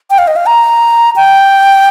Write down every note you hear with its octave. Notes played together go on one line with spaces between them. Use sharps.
G5
F5
D#5
F5
A#5
G5